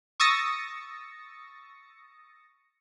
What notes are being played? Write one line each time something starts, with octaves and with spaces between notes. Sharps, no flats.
C#6 D#6 E6 A6 A#6 C#7